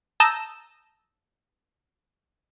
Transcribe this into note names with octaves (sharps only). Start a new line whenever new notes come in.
A5 A#5 D#6 E6 G6 A#6